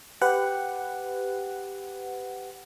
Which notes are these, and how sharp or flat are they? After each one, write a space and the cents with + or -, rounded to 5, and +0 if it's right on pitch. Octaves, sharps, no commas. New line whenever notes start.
G4 +0 B4 +25 F#5 +0